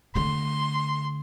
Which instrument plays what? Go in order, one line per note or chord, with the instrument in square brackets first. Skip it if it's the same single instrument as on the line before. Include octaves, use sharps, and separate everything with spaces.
[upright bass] D3 A3 [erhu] C6